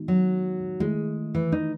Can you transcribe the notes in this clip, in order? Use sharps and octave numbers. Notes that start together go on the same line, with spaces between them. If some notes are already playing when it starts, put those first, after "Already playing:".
Already playing: D#3 G#3 B3 D#4 F#4
F#3
D#3 G#3 A3 E4
E3
D#4